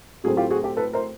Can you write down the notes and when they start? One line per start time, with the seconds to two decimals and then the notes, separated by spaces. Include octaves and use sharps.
0.24 A2 F#3 A3 C4 F#4 G#4
0.37 F4 G4
0.51 F#4 G#4
0.63 G4 A4
0.77 A4 B4
0.93 A#4 C5